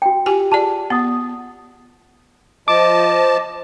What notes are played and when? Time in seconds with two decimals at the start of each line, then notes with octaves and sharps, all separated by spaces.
0.02 F#4 G5
0.26 F4 G4 G#5
0.52 F4 G#4 D5 A5
0.90 B3 F#5 D#6
2.68 F3 D#5 A5 D6